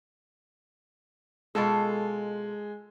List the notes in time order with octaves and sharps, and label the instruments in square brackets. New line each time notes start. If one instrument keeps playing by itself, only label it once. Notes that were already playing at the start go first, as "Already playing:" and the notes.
[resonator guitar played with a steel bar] B2 F4 A4 [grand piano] G#3